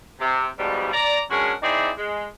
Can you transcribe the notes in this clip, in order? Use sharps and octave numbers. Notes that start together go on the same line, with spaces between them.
C3
G#2 B2 F3 G3
D5 A#5
G#3 C#4 D4 F#4 G#4 A#4
C4 D#4 E4 G#4 D5
G#3